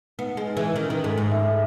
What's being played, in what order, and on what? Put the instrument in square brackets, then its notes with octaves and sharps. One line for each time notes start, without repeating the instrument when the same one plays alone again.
[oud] B3 [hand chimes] D#4
[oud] G#3
[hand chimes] D#4
[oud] E3
[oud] D#3 [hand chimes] C#4
[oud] D#3
[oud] G#2 [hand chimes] A4
[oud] G#2
[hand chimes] E5